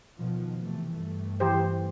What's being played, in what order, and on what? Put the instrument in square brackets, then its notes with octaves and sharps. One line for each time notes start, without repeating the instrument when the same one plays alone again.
[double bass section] B2 D#3 F3
C3 E3 A3
G2 A3
[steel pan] E3 G4 C5